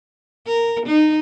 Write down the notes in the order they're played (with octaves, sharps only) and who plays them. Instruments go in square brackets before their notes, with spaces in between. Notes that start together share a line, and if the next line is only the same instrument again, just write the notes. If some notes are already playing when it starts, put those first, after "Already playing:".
[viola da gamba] A#4
D#4